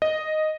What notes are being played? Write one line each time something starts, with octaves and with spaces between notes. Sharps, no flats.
D#5